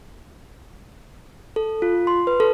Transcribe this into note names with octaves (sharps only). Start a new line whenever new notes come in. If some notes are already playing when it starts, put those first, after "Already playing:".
A4
F4
C6
B4
A4